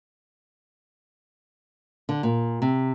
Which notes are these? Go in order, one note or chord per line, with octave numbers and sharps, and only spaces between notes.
D3
A#2
C3